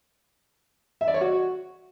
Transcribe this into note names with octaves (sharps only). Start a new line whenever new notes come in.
E5
D5
C#5
F#4